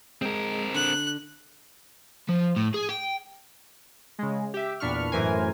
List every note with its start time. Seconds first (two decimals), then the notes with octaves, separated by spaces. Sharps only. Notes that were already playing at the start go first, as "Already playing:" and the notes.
0.22 G#3 C4 A#4
0.74 D3 F#6
2.29 F3
2.56 A2
2.74 G#4
2.89 G5
4.19 C#3 G#3
4.54 G4 E5
4.80 E2 A#2 D4 B5 C#6 F6
5.12 F#2 A2 E3 A#4 C5 G#5